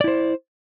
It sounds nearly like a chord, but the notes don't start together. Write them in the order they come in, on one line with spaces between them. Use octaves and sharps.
D5 E4 C5